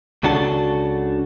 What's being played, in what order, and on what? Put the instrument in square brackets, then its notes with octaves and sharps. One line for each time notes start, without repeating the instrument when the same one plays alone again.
[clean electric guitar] C#2 C#3 D4 F#4 A4 A5